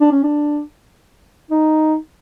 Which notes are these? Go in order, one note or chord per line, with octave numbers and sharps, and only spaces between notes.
D4
C#4
D4
D#4